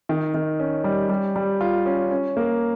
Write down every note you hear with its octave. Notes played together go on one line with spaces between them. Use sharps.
D#3
D#3
C#4
G3
G3
G3
F4
C#4
C#4
A#3